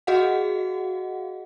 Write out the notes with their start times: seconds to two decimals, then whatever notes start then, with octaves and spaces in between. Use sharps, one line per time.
0.07 F#4 G#4 D#5 F5 F#5